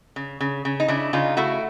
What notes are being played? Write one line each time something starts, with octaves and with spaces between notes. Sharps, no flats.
C#3
C#3
C#3
D#4
C#3 D4 E4
C#3 D#4 F4
A3 E4 F#4